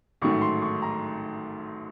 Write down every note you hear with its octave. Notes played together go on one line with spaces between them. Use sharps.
A1 G#2 D#3 F#3 A3 C#6
C6
C#6
A#5